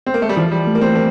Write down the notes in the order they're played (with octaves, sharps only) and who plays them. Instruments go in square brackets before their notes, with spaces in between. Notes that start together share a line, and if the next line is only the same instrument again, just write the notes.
[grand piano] C4
A#3
A3
G3
[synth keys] E3 [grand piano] F3
[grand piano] G3
[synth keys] A3
[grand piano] A#3
C4
A#3